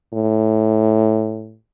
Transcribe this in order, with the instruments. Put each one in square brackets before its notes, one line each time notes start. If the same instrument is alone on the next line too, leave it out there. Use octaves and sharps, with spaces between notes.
[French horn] A2